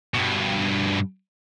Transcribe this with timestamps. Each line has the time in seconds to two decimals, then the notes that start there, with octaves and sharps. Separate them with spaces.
0.14 G2 B2